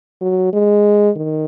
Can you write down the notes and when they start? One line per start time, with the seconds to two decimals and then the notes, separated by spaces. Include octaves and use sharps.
0.22 F#3
0.53 G#3
1.16 D#3